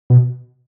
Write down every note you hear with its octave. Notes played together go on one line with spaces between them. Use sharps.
B2